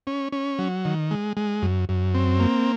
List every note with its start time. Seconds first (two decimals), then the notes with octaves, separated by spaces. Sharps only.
0.07 C#4
0.32 C#4
0.59 F#3
0.85 D#3
1.11 G#3
1.37 G#3
1.62 F#2
1.89 F#2
2.15 C4
2.40 A#3